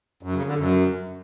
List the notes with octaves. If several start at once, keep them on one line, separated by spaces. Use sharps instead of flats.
F#2
C#3
D3
F#2